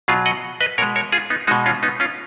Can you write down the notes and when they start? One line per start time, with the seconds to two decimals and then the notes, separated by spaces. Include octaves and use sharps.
0.08 B2 F#3 F4 G#4
0.26 D#5 F#5
0.61 B4 D#5
0.78 B2 G#3 A#4 C#5
0.96 A#4 C#5
1.12 F4 G#4
1.30 B3 D#4
1.47 G#3 D#4 F#4
1.51 B2
1.66 C#4 F4
1.83 B3 D#4
2.00 C#4 F4